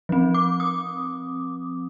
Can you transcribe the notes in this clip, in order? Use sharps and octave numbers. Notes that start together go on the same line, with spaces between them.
F3 C4
D6
D#6